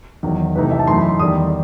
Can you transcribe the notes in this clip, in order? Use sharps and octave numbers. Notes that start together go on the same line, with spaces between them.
E2 D#3 F#3
E2 C3 E3 A3 D#4 B4
E5
A5
F#2 E3 A3 D#4 C6
B5
C6
E2 D#3 G3 D#6